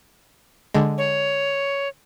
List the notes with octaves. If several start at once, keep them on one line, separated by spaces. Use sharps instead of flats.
D3 G#3
C#5